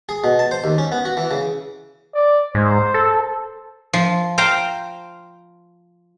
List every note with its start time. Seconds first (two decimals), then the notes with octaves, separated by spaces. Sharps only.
0.09 G#4
0.24 B2
0.39 A5
0.51 C5
0.64 D#2
0.78 C#4
0.92 B3
1.05 F#4
1.17 E3
1.31 C#3
2.14 D5
2.55 G#2 C5
2.94 A4
3.93 F3
4.38 C5 F5 G5 A#5